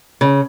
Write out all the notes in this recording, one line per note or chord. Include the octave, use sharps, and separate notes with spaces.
C#3